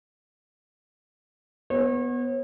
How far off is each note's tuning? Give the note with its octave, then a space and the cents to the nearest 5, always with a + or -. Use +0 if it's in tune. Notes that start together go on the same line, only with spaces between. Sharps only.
B3 +0 C#5 -40